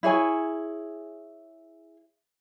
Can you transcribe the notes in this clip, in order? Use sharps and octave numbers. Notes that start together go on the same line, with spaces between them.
E4 G#4 C#5 G#5